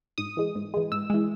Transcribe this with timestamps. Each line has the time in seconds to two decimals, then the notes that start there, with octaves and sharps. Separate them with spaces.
0.18 G#2 D#6
0.37 E3 G#3
0.55 G#2
0.74 E3 G#3
0.92 G#2 E6
1.10 E3 G#3